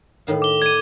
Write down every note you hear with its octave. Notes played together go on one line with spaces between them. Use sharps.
A2 D#3 F5
D6 G7
D5 G#6 D#7